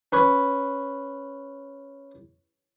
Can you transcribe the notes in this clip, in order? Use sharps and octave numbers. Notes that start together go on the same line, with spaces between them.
C#4 B4 C#5